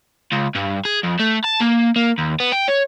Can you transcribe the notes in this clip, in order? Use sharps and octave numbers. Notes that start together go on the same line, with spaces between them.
C#2
G2
G#4
F2
A3
A5
A#3
A#3
D#2
B3
G5
C#5